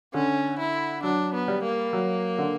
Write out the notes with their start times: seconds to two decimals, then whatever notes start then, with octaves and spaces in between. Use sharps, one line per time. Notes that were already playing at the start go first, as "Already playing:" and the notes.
0.14 D3 C#4
0.59 E4
1.03 F#3 D4
1.34 B3
1.48 G3
1.63 A#3
1.93 F#3
2.38 D3